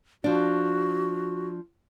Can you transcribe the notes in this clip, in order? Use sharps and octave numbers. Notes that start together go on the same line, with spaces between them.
F3 D4 F#4